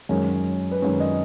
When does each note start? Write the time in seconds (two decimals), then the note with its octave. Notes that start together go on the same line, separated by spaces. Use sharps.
0.09 F#2 D#3 G#3 C#4 A#4
0.71 B4
0.82 F#2 D#3 G#3 C#4 C#5
1.00 D#5